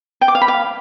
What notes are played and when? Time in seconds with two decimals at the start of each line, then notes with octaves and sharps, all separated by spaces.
0.21 G5
0.28 D6
0.35 F5
0.42 B5
0.48 F5